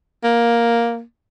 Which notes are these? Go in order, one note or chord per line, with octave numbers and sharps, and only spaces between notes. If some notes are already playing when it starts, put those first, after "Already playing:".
A#3